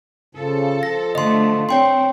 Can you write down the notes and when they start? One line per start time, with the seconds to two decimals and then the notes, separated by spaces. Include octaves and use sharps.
0.35 C#3 F3 A4
0.83 F3 A#6
1.15 D3 A3 D#5 C6
1.69 C4 C#5 G5 C6